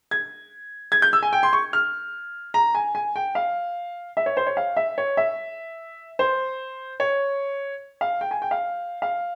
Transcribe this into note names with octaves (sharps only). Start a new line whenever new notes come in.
G#6
G#6
G6
E6
G#5
G5
C6
C#6
F6
A#5
G#5
G#5
G5
F5
E5
C#5
C5
C#5
F5
E5
C#5
E5
C5
C#5
F5
G5
G#5
G5
F5
F5